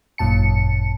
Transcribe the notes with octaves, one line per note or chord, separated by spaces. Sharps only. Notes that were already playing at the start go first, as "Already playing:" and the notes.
G#1 F#2 A#2 A5 C#7